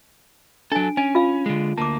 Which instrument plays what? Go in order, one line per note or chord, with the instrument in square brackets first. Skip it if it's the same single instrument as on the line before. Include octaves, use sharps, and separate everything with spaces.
[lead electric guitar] F#3 A4 [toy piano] D4 G#5
[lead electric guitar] C#4 [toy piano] G#5
[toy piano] F4 F5
[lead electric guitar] D3 G#3
[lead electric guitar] D2 A#3 [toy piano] A5 D6